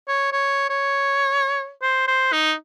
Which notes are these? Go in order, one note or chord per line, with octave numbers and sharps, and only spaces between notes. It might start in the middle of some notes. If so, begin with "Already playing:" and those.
C#5
C#5
C#5
C5
C5
D#4